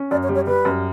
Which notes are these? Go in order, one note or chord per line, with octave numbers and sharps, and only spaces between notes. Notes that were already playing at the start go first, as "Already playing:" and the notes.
Already playing: C#4
F#2 D5
C#5
G3
C#5
G3 B4
F#2